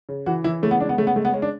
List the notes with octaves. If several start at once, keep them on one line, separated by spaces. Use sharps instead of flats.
C#3
E3 F#4
E3 E4
C#3 A3
B3
G#3 D4
B3
C#3 A3
B3
G#3 A3
B3
G#3 C#4
D4